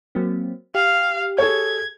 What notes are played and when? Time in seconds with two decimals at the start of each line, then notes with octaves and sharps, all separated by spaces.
0.15 F#3 A#3 C4
0.75 G4 F5
1.38 G#4 A4 C#5 G#6